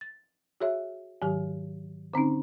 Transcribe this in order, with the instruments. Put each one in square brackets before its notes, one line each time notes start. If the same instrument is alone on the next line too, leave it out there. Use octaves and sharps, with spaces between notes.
[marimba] A6
F#4 G#4 C#5 E5
G#2 D#3 F#3 G4
D3 C4 C#4 D#4